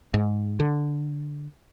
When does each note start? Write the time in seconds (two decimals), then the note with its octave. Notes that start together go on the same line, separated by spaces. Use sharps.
0.14 G#2
0.60 D3